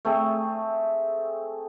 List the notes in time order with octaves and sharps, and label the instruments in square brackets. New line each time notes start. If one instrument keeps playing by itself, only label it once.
[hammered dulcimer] A3 C4 G#4